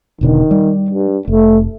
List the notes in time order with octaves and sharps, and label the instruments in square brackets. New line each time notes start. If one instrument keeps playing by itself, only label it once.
[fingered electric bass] E1 B2 D3 [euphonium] D#3
[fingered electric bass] G3
[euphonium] G2
[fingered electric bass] F1 [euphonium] A3